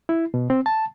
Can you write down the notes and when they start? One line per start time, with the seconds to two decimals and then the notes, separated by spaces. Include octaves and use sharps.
0.09 E4
0.34 B2
0.50 C4
0.66 A5